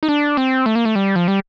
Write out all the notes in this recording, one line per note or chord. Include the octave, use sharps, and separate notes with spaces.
D#4
D4
C4
A3
A#3
A3
G3
F3
G3